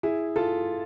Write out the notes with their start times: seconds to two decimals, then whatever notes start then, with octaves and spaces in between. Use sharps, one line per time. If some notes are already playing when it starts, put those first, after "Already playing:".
0.03 E4 G#4
0.36 F4 A4